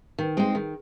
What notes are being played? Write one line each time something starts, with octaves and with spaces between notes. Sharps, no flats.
D#3
G#3 C4 D#4
D#3